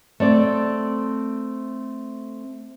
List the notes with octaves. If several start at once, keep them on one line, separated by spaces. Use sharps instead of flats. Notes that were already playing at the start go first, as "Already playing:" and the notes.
A3 C4 D5